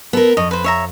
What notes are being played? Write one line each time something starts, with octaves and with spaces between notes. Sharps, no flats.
B3 A4 A#4
F2 C#5 D#5
B4 C5
C#5 E5 A#5